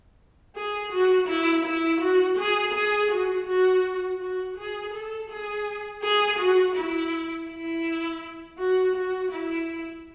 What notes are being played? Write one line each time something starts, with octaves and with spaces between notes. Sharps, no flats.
G#4
F#4
E4
E4
F#4
G#4
G#4
F#4
F#4
F#4
G#4
A4
G#4
G#4
F#4
E4
E4
F#4
F#4
E4